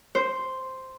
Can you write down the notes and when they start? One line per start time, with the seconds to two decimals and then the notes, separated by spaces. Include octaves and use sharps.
0.15 C5